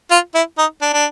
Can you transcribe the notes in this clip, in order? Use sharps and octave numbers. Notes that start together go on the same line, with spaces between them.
F4
E4
D#4
D4
D4